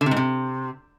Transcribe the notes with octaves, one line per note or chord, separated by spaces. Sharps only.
D3
C3
G#2
C3